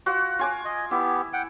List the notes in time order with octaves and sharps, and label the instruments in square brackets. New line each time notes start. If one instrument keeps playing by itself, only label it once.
[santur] F4 F#4
F4 G#5 D6
[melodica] D#5
[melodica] B3 G4 [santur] E4
[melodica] F#5 G5